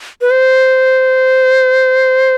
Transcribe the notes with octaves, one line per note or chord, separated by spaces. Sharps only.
B4
C5